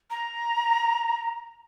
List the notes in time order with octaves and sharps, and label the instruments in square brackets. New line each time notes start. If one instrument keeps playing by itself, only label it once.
[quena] A#5